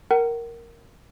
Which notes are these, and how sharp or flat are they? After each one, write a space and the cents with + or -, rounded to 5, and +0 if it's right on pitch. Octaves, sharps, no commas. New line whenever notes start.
A#4 +0 F#5 +40